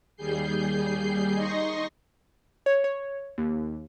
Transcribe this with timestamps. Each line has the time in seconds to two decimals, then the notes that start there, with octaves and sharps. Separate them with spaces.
0.17 D#2 G3 G#4 G6 C7
1.34 D#4 D#5 C6 C#6 A#6
2.66 C#5
2.84 C#5
3.38 D#2